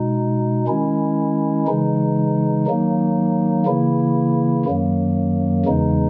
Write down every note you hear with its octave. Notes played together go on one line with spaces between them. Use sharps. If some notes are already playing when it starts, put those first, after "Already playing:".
Already playing: B2 G#3 D#4
D#3 G#3 C#4 E4
C#3 E3 G#3 D#4
D#3 F#3 A#3 D#4
C#3 E3 A#3 E4
F#2 D#3 F#3 A#3
E2 C#3 E3 G#3 D#4